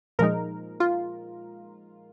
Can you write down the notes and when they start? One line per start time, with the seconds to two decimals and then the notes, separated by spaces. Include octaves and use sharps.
0.19 A#2 F3 G#3 D#4 A#4
0.80 F4